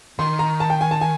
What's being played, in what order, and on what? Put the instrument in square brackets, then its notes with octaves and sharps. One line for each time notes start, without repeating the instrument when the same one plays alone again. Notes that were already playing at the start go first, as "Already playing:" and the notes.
[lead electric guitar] D#3 [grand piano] C6
[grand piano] A#5
A5
G5
G#5
A5
G#5